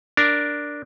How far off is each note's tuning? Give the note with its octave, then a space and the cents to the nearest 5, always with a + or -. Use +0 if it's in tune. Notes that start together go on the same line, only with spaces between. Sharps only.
D4 +0 A#4 +0